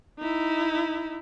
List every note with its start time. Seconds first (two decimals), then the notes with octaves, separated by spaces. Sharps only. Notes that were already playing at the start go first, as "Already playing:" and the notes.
0.19 D#4 E4